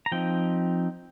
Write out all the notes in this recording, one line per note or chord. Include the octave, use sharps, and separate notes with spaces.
A#5
F3 C4 D#4 G5